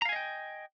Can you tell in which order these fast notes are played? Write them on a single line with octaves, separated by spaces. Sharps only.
A#5 F5 G#5 D#5 G5